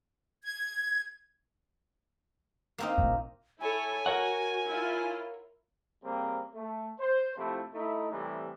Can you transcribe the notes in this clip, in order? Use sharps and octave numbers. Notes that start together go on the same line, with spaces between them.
G#6
A#3 C4 D#4
A#1
E4 A4 C#5 G#5
F#4 A#4 C#5 F#5
E4 F4
C#3 G3 A#3 C4
A3
C5
C3 F3 A3 C4 E4
A3 D#4 E4
A2 C3 E3 G3 C4 E4